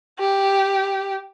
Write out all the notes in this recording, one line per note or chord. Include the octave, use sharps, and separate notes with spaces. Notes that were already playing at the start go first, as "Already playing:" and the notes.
G4